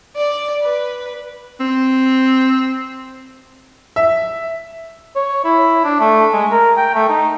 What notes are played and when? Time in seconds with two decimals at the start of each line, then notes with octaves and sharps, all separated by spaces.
0.16 D5
0.62 B4
1.60 C4
3.96 E5
5.16 C#5
5.45 E4
5.84 D4
6.00 A3
6.33 G#3
6.51 A#4
6.77 G5
6.94 A3
7.09 D#4